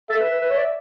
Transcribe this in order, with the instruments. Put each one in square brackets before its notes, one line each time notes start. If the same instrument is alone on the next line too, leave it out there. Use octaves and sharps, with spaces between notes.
[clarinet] A4 [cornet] E5
[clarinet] B4
B4
B4
C#5
D5